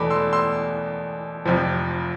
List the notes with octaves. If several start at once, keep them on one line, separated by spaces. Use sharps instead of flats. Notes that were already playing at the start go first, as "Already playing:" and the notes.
Already playing: E2 B2 A3 B5 D6
C6 E6
C6 E6
F1 F2 C3 F3